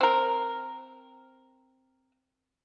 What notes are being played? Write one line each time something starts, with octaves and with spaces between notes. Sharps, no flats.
C4 A#4